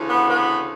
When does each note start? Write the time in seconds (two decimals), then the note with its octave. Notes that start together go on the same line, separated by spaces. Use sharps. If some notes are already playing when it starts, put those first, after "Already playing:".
Already playing: D2 C#3 E3
0.08 B3
0.29 B3